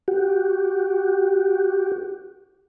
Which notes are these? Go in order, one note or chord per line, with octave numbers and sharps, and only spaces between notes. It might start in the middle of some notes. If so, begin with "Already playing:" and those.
F#4 G4